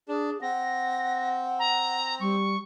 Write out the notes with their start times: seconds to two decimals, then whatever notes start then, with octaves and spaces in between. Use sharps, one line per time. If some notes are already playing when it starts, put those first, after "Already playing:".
0.09 D4 G#4
0.42 C4 F#5 A#6
1.59 A#5
2.20 G3 C#6